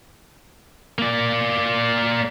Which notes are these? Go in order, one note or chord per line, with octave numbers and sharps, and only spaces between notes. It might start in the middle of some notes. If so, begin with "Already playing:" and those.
A#3 D5